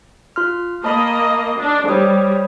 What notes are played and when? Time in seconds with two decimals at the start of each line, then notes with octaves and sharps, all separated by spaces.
0.36 F4 C6 F6
0.84 A#3 D#5 A5 B5
1.60 D4
1.88 G3 C5 C#5 D#6